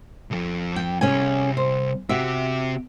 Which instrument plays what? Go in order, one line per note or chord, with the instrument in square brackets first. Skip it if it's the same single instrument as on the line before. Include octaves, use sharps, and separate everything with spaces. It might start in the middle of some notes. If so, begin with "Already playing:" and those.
[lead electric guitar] C2 F2
[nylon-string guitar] G5
[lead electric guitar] C2 [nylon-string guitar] C#4 G#4 G#5
[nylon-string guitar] C5
[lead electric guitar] C3 G4 [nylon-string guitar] F#4 E5